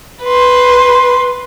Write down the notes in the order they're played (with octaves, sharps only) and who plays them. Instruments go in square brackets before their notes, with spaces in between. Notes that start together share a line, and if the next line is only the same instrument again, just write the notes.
[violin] B4 C6